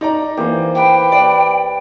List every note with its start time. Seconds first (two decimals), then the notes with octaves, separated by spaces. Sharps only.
0.01 D#4 D5 A#5
0.37 E3 A#3 G4 C5
0.75 G4 B4 G5
1.12 D5